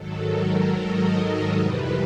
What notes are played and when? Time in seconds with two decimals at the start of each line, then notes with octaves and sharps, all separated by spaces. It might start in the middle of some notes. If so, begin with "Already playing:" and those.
Already playing: G#2 D#3 F#3 A4
0.34 A#4
0.74 D#5
1.55 F2 C3 E3 G3 B4